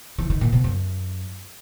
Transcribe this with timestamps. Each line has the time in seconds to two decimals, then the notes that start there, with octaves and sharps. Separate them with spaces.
0.18 E3
0.30 D#3
0.41 A#2
0.53 B2
0.64 F#2